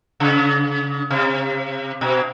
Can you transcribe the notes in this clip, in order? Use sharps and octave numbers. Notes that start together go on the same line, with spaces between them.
C#3
C3
B2